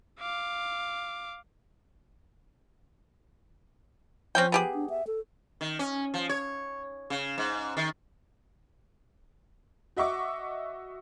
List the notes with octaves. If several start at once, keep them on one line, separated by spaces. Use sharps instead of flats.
F5 D6
F3 C4 C#4 G5
B3 G4 G#4
D4
E5
A4
D#3
C#4
F3
C#5
C#3
G#2
D#3
F#4 D#5 E5 F#5 C#6 D6